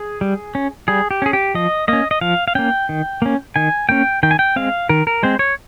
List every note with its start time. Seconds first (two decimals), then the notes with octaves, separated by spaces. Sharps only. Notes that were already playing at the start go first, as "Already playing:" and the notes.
Already playing: G#4
0.21 G3
0.55 C#4
0.88 G3 G#4
1.11 G4
1.22 C#4 G#4
1.33 G4
1.54 F3 D#5
1.88 A#3 C#4 D#5
2.11 D#5
2.21 F3 F5
2.48 F5
2.55 A#3 C#4 G5
2.89 D#3
3.22 A#3 C#4
3.56 D#3 G#5
3.89 A#3 C#4 G5
4.23 D#3 G5
4.31 G#5
4.39 G5
4.56 G#3 C4 F5
4.89 D#3 A#4
5.07 A#4
5.23 G#3 C4 C5
5.39 C#5